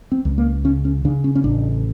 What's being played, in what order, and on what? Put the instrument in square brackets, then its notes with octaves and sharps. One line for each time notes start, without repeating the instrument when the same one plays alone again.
[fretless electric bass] C4
C#2
A#3
C#3 C#4
C#4
C#3 D4
C#4
C#4
A1 D4